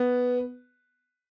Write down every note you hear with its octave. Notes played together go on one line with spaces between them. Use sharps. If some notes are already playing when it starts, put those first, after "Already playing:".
Already playing: B3